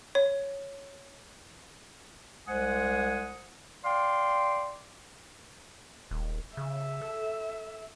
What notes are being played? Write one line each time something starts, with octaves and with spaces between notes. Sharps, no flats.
C#5
C2 G#3 C5 F#5 G#5 D#6
D5 F5 G5 C6
D#1
C#3 E5
A4